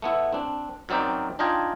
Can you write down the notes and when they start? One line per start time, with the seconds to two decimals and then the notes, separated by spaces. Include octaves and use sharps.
0.02 A3 B3 E4
0.32 C4 D4
0.89 F#2 F#3 C4 D#4 D5 G5
1.39 D4 D#4 F4 D#5 G5 G#5